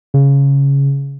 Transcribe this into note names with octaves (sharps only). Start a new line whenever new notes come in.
C#3